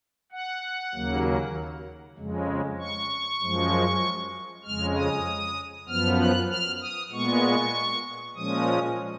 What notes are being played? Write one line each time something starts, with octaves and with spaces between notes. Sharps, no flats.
F#5
D#2 C#3 F#3 A#3
F2 C#3 G#3
C#6
F#2 F3 G#3
F2 C#3 G#3 F6
D#6
F#2 F3 B3 F6
F#6
F6
D#6
A#2 G#3 B3 C#6
A#2 F3 G#3 C#4 D#6